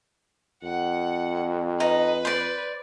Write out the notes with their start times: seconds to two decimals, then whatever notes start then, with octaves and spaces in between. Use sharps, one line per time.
0.63 F2 F#5
1.80 D#4 B4
2.25 C5 D5